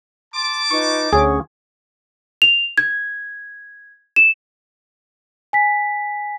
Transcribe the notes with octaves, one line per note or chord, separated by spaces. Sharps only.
A5 C6 D6
D#4 F4 B4 C#6
D2 C#4 G#4 C5 F#5 C#6
F7
G#6
E7
G#5 B6